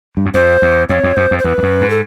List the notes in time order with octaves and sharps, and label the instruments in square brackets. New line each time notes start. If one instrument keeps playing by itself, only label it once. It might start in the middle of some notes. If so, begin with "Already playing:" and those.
[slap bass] G2
F#2
[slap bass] F2 [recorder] C5
[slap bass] E2
[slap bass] F2 [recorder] C#5
[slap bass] F2
[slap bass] F#2 [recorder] C5
[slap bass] F2
[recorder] C5
[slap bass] E2 [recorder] B4
[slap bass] F2
F#2
G#2
[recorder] A4